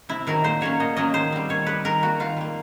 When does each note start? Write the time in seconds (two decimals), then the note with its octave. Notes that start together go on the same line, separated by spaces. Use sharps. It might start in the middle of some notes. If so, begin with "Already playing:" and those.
0.09 C3 E4
0.27 D#3 F#3 A#4
0.44 A#2 C5
0.61 F#3 A#3 C#4 C#5
0.80 A#2 D#5
0.97 F#3 A#3 C#4 D#5
1.14 D#3 C5
1.32 G3 C4
1.49 D#3 C#5
1.66 G3 C4 B4
1.85 D#3 A#4
2.02 G3 A#3 F#4
2.20 D#3 F4
2.37 G3 A#3